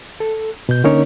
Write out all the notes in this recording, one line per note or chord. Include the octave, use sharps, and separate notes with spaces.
A4
B2 G6
D3 A#3 C#4 D#4 A#4 C#5